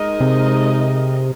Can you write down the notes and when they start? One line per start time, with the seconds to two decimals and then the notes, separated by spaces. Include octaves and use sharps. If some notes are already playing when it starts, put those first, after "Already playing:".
Already playing: G#3 D#4 A#4 D#5
0.20 C3